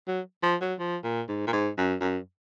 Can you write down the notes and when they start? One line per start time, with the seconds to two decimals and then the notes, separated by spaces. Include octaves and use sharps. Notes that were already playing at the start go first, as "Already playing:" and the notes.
0.08 F#3
0.43 F3
0.61 F#3
0.79 F3
1.04 A#2
1.28 G#2
1.47 A#2
1.53 G#2
1.78 F#2
2.01 F#2